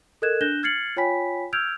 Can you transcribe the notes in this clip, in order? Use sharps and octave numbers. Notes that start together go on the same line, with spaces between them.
A4 A#4 D#5 F#6 G#6 E7
D4 F#6 G6 A#6 E7 G7
F6 G#6 A6 C7 C#7 F#7
F4 C#5 G5 G#5 B5 B6
E6 F6 G6 G#6 D7 F7